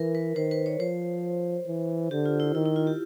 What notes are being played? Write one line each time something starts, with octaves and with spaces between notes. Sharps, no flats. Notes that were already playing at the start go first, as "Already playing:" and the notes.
Already playing: E3 A#4
B4
D#3 C5
B4
C#5
F3 C5
E3
D3 G4
F4
E4
D#3 E4
E4
F4
G4